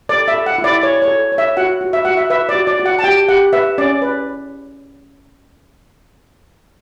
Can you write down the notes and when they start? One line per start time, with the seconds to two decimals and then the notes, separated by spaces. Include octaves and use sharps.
0.09 A4 D5
0.28 E5
0.34 A4
0.46 F#5
0.58 E4
0.64 D5
0.83 C#5
1.02 C#5
1.08 A4
1.32 C#5
1.38 E5
1.57 F#4 F#5
1.81 F#4
1.93 E5
2.05 F#4 F#5
2.17 E5
2.30 B4 E5
2.49 D5
2.55 F#4
2.67 D5
2.80 F#4
2.86 F#5
2.99 A5
3.04 G4 G5
3.29 G4 F#5
3.53 B4 E5
3.78 C#4 D5
4.02 B4